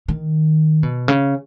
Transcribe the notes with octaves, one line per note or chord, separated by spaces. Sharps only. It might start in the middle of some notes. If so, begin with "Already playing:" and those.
D#3
B2
C#3